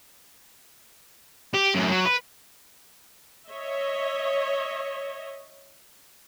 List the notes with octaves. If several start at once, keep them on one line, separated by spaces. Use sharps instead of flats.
G4
F#2 A2
F#3
B4
C#5 D#5 E5